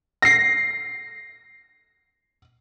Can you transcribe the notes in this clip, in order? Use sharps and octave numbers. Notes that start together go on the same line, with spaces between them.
A#6 C7